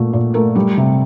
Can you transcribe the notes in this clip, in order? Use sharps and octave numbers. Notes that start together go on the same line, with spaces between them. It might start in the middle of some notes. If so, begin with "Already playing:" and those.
Already playing: A#2 A3
A#2
A3 A#4
G3
C3